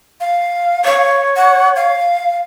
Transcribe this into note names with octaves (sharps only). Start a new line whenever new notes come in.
F5
C#5
F#5
F5